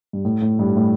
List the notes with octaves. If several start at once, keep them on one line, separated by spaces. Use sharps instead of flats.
G2
A2
A2
G2
A2